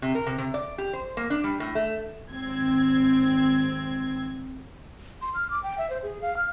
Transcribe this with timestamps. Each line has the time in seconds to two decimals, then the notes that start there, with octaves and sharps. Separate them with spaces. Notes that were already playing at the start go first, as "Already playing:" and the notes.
0.02 C3
0.15 A#4
0.27 C3
0.38 C3
0.54 D5
0.78 G4
0.93 C5
1.17 A#3
1.30 D4
1.44 G3
1.60 A2
1.75 A3
2.30 G#1 C4 G#6
5.22 C6
5.35 F6
5.51 D6
5.63 G5
5.78 E5
5.90 C5
6.03 G#4
6.22 F5
6.37 F6